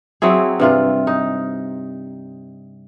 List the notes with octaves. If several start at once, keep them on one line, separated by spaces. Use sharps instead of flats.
F#3 C4 E4 G#4
G2 C3 F4
D#4